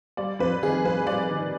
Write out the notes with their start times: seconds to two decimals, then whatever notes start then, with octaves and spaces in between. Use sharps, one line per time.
0.17 G3 D5
0.39 F2 B4
0.62 D#3 G#4
0.84 F2 B4
1.07 G3 D5
1.29 D#3